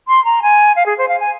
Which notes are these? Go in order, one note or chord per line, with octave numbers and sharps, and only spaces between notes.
C6
A#5
G#5
F5
G#4
C5
F5
G#5